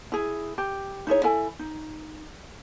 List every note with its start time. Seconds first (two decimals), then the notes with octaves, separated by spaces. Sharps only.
0.12 E4 G#4
0.58 G4
1.07 D#4 E4 G#4 C#5
1.23 E4 A4 G#5
1.59 D#4